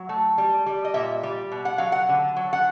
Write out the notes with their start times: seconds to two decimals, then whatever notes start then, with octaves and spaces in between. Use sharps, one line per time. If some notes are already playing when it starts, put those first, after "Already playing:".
Already playing: F#3
0.09 A3
0.38 G3
0.66 G3
0.85 D#5
0.94 A#2 E5
1.23 G3
1.52 B2
1.65 F#5
1.78 F#3 F5
1.92 F#5
2.09 D3
2.36 F#3
2.53 F#5